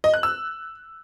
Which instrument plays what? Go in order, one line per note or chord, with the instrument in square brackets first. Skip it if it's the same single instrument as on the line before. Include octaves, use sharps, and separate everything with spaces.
[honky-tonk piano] D#5
F#6
E6